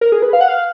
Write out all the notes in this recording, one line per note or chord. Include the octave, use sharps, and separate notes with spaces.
A#4
G#4
B4
F5
F#5
F5